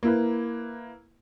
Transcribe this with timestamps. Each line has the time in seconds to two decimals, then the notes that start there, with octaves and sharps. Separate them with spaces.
0.03 A#3 E4 B4